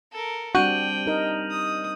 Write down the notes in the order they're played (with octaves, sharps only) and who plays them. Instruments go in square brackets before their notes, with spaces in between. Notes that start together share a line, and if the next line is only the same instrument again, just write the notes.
[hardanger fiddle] A4 A#4
[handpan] G3 C4 D4 [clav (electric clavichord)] F#4 [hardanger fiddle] G5 [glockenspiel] G6 D#7 F#7
[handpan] D#4 A#4 D#5
[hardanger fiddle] D#6